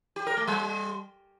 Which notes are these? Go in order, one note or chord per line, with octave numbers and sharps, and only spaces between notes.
G4
A#4
A3
G3